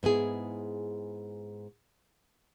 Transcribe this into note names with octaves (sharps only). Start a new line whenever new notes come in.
G#2 B3 E4 G#4